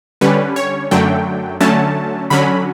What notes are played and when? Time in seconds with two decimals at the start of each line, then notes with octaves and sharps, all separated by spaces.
0.21 D3 G3 C#4 B4
0.56 C#5
0.91 F#2 D3 F#3 A3 G5
1.60 D3 F#3 A3 C#4 A5
2.30 D3 F#3 C#4 B5